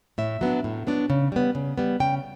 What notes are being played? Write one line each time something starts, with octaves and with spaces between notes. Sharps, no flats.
A2 E5
F#3 B3 D4
A2
F#3 B3 D4
C#3
G3 B3
C#3
G3 B3
C#3 G5